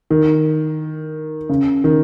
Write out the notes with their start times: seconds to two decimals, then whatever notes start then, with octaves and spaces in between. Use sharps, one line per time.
0.10 D#3
1.49 C#3
1.84 D#3